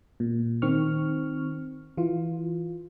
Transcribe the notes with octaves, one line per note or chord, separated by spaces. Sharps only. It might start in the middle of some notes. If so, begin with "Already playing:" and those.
A#2
D#3 C4 C#6 F6
E3 F4